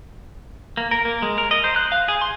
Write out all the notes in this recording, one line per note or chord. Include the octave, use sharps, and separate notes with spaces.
A#3
A#4
A#3
G#3
A#4
D#5
C5
F#6
F5
G#4
C6